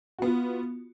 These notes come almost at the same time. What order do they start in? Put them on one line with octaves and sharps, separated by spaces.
F#4 B3 F4